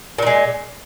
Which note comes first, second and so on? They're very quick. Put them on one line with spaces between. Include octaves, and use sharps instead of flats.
A#2 D#3 G#3